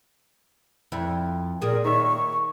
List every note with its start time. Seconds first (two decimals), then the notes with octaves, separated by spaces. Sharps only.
0.92 F2 E4
1.61 A#2 G#4 A#4
1.84 D#3 C#5 E5 C#6